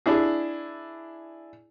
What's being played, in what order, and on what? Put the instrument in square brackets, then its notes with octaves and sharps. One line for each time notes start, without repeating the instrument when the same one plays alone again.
[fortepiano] D4 E4 G#4